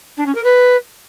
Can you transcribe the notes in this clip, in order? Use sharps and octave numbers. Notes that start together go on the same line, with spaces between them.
D4
C#4
A#4
B4